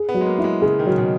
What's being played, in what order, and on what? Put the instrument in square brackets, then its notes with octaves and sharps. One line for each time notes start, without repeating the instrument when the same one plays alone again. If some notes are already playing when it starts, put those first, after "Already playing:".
Already playing: [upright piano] G#4
[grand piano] B3
[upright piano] F#3
[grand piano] G#3
A#3
[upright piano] E4
[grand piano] G#3
[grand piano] C#3 [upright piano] G#4
[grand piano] D#3
[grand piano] C#3 [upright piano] F#3
[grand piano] B2